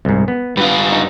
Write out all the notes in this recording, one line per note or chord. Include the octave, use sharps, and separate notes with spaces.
C2 G#2
B3
G2 F4 B4
D#4